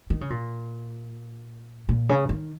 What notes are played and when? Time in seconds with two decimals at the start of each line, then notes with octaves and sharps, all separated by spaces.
0.10 D#3
0.21 C#3
0.30 A#2
1.89 A#2
2.09 C#3
2.29 D#3